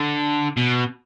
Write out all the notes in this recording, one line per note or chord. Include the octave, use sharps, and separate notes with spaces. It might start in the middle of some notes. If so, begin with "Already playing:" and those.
Already playing: D3
B2